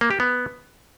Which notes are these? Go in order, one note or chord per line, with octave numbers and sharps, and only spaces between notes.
A#3
G4
B3